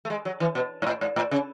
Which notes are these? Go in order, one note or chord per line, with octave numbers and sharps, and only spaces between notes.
A3
G#3
F#3
E3
B2
G#2
A2
G#2
A2
C#3